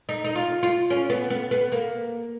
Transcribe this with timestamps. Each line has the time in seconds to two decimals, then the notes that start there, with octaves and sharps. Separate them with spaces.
0.09 D#4
0.24 D#4
0.36 F4
0.63 F4
0.90 C#4
1.10 B3
1.30 B3
1.51 B3
1.72 A#3